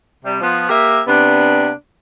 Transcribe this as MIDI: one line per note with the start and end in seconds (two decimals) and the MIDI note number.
0.24 0.39 48
0.24 0.39 55
0.41 0.67 53
0.41 0.67 59
0.69 1.00 58
0.69 1.00 67
0.69 1.00 70
0.69 1.00 76
1.08 1.70 48
1.08 1.70 59
1.08 1.70 62